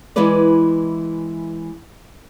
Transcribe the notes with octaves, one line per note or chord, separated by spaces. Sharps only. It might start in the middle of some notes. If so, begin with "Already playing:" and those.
E3 G#3 E4 G#4 B4 D5